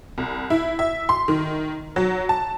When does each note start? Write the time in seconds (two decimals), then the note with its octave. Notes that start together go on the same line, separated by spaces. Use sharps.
0.18 C2
0.50 E4
0.79 E5
1.09 C6
1.28 D#3
1.96 F#3
2.29 A5